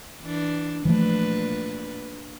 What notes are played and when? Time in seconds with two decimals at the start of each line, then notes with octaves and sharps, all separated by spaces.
0.21 E3 D4
0.85 A#2 E3 F3 A3 D4 B4